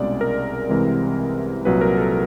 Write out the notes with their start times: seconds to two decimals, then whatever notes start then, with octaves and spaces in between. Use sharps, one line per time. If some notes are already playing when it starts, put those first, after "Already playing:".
Already playing: C2 B2 G#3 C#4 D5
0.21 A#4
0.69 C2 C3 E3 G#3 C4
1.65 C2 A#2 F#3 B4
1.81 A#4
1.98 A4